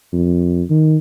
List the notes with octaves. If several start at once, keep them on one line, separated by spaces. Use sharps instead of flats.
F2
D#3